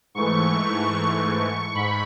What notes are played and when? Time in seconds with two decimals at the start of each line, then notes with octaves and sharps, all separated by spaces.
0.15 G#2 E3 A3 C#6
1.75 G#2 B5